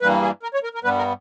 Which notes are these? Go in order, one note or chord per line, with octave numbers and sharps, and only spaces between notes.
G2 E3 G3 A#3 B4
G#4
A#4
C#5
A#4
A#4
G2 G3 B3 B4
A#4